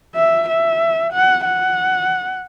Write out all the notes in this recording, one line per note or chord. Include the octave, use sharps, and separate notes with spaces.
E5
E5
F#5
F#5